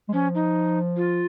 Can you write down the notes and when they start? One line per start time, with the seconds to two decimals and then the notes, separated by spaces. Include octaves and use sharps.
0.09 G#3
0.13 F3 C#4
0.35 D#4
0.97 F4